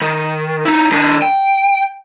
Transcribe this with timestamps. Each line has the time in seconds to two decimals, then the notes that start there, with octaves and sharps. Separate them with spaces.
0.01 D#3
0.65 D#4 E4
0.91 D#3 D4
1.22 G5